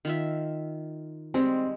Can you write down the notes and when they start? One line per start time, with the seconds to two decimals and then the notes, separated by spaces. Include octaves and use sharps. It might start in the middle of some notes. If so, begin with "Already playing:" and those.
0.05 D#3 F4 E5
1.34 G3 G#3 C4 G#4